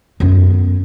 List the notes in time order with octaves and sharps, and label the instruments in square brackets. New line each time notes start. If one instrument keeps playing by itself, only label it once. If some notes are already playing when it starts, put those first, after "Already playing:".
[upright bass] F#2 B3